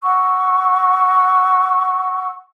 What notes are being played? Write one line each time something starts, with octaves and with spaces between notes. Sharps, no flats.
F#5 C#6 E6